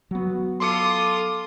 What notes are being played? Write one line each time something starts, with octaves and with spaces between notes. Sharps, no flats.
F#3 B3 F#4
F4 A4 C6 D6 D#6 C#7